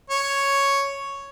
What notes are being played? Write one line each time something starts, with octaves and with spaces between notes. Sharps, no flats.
C#5